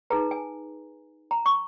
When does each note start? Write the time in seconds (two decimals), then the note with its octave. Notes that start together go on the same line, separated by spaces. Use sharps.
0.10 D#4 G#4 B4 A#5
0.31 G#5
1.31 A#5
1.46 C#6